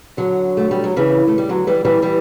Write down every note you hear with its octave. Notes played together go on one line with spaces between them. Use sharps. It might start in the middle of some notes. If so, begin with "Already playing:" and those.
D3 F#3
A3
G3
F#3
C#3 E3
A3
G3
D3 F#3
E3 G3
E3 G3
E3 G3